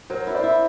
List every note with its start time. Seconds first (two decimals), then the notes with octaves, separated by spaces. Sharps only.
0.10 F#3 A#4 C5
0.27 E4
0.35 C5 D5
0.43 E4